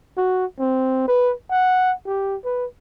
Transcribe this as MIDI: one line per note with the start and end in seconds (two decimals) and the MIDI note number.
0.17 0.45 66
0.59 1.04 60
1.08 1.33 71
1.50 1.93 78
2.06 2.36 67
2.44 2.66 71